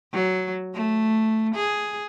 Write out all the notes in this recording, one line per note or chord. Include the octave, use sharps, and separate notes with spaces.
F#3
A3
G#4